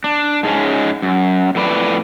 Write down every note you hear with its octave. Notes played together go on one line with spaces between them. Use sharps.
D4
G#2 G#3 C#4
F#2
F2 A2 B4 D5